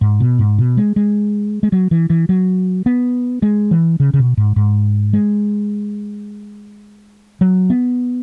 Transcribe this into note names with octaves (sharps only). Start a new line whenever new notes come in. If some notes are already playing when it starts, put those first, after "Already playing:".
G#2
B2
G#2
B2
G#3
G#3
G#3
F#3
E3
E3
F#3
B3
G#3
E3
C#3
C#3
B2
G#2
G#2
G#3
F#3
B3